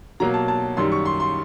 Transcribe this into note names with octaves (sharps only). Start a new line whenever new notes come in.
B2 F#3 A#3 A#5
A5
A5
F#2 D#3 G3 C6
C#6
C6
C6